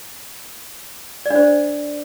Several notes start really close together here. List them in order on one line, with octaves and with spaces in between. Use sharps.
D5 D4 C5